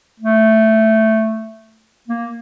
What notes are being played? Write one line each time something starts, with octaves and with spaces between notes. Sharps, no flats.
A3
A#3